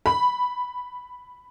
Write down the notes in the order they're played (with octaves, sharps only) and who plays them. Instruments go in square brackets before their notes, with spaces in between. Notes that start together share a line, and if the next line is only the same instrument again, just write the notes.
[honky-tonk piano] B5